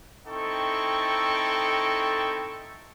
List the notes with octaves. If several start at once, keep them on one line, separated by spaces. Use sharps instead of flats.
C4 D#4 E4 A4 G5 C#6